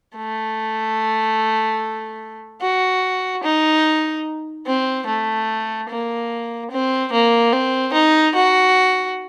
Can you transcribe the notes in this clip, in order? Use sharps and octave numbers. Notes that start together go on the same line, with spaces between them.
A3
F#4
D#4
C4
A3
A#3
C4
A#3
C4
D#4
F#4